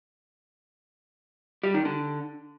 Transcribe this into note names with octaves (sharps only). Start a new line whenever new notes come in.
G3
D#3
D3